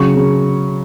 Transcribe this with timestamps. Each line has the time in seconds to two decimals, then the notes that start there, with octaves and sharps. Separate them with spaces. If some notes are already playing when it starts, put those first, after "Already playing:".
Already playing: C#3 F#3 C#6
0.16 C#3